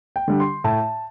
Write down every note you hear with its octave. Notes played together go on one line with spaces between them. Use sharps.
G5
D3 G3
C6
A2 A5